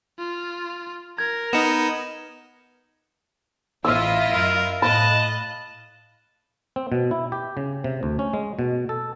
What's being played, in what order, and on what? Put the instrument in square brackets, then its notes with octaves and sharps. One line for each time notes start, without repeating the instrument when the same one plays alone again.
[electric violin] F4
[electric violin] A#4 [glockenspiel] G#6
[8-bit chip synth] B3 D#4 [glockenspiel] C#7 E7
[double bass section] A1 [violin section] E4 F4 D#5 [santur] F5 E6
[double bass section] F#2 [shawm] A#4
[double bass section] A2 [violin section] D#5 F#6 [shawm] A5 [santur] B5
[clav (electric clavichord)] C4
B2
E4
G4
C#3
C3
D2
C#4
G#3
B2
A4